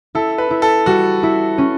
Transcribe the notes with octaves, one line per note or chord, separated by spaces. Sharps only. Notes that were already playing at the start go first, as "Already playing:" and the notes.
E4 A4
B4
E4
A4
G3 F#4
E4
C#4